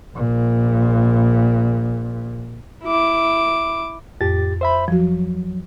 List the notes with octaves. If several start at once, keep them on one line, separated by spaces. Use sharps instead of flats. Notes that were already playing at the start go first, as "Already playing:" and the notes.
A#1 A#2
E4 D6
F2 A2 G4 A6
C5 E5 B5
F3 F#3 F#4